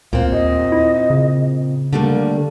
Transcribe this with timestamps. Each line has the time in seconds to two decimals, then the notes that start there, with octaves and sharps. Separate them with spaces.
0.13 D2 A#2 C4 F5
0.32 D#2 D#5
0.72 E4
1.10 C#3
1.93 D3 G3 A3 A#3